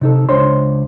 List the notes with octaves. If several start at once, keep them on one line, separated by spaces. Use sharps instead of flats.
C3 D#4 A4
C#2 D4 C5 C#5 C6